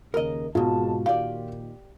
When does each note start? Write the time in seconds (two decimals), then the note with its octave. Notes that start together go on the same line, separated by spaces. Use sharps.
0.14 D#2 C#3 A#4 D#5
0.55 G#1 G#2 B2 G#3 F4 F#4 A5
1.06 A#2 D#3 G4 D5 F5